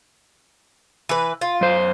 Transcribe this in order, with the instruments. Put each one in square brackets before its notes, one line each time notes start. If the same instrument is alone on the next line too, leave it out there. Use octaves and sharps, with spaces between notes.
[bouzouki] E3 B4
F4
[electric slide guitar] F#2 C5